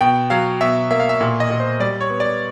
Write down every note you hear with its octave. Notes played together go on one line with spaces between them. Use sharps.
B2 G5
F#3 F5
B2 E5
A#3 E5
F5
E5
A#2 E5
D#5
A#2
C5
G3 D5
C#5
B3
D5